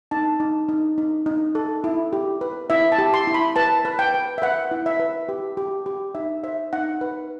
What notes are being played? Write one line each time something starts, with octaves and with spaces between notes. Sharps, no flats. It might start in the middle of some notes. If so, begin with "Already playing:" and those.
D#4 A5
D#4
D#4
D#4
D#4
A4
E4
G4
B4
E4 E5
A5
G4
C6
E4
B5
B4 A5
B4
G5
B4
E5
B4 F#5
E4
E5
B4
G4
G4
G4
D#4 E5
C5 E5
D#4 F#5
B4